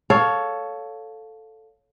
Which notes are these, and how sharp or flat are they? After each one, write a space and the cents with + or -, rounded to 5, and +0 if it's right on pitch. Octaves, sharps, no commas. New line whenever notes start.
A4 +0 C#5 +10 F5 +15